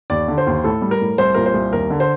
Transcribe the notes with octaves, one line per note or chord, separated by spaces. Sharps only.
D#2 D5
D3
C5
D#2
A2 A4
G3
A#4
A2
C2 C5
A#2 A#4
C5
C2
D#2 A#4
D3
C5